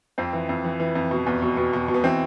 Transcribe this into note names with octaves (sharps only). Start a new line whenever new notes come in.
F2 C4
E3
F2
E3
E3
F2
B2
E2
B2
B2
B2
B2
B3
E3 C4